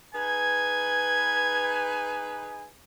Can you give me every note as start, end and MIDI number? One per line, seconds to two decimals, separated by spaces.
0.15 2.71 63
0.15 2.71 68
0.15 2.71 71
0.15 2.68 80
0.15 1.89 92